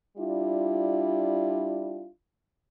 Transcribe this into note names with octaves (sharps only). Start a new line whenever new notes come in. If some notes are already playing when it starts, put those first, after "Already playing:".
G3 D4 E4 F4